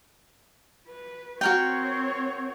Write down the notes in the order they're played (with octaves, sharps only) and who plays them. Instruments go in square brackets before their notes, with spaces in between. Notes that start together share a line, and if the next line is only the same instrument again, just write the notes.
[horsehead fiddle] B4
[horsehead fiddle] C4 C#5 [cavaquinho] F#4 A#4 G5